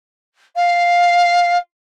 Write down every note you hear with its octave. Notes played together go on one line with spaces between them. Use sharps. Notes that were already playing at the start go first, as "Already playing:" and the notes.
F5